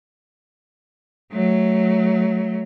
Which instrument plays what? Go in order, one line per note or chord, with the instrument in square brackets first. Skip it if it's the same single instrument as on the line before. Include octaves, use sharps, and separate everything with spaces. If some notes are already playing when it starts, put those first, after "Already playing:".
[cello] F#3 A3